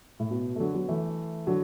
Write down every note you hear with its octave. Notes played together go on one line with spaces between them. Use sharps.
A2
B2
A3
D3 F#3
F#3 B3
E3 A3
D3 F#3